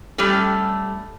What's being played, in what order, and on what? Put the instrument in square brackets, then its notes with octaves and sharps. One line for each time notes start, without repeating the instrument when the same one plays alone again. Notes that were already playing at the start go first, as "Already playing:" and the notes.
[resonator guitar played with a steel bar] G3 A3 C#4 G4 A4